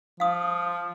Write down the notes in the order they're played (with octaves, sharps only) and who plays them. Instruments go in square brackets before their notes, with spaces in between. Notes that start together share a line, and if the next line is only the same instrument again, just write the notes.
[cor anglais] F3 [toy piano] F5 D#6